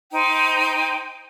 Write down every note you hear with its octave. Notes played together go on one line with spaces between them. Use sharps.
D#4 C5 G5